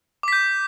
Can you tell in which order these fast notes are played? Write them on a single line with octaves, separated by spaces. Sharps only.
D6 B6 G6